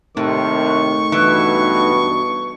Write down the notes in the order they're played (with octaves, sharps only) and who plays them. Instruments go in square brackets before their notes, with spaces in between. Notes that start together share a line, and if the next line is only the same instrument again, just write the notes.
[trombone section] D#2 C3 D#3 [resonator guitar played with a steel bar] A2 [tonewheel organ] A3 D#4 [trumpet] C#6
[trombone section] B1 G2 B2 [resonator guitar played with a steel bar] E3